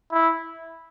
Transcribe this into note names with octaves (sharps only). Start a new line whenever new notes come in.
E4